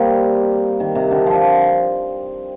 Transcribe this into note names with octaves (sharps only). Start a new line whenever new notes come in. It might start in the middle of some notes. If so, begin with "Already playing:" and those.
Already playing: G3 A#3 C4
D#3
C3
D3
F3